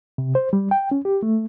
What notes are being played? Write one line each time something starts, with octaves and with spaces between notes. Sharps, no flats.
C3
C5
G3
G5
C#4
G4
A3